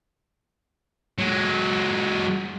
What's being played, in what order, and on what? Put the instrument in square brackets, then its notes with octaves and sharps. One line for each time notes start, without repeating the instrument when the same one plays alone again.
[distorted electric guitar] F#3 G#3